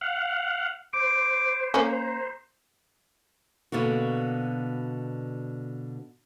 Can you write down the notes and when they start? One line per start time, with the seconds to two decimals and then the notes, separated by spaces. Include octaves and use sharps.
0.01 F5 F#5
0.93 C5 D6
1.74 A#3 C#4 A#5
3.72 B2 D3 A#3 F#4